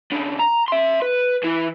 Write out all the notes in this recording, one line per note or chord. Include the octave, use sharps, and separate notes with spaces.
C#3 D4
A#5
E5 C6
B4
E3 E4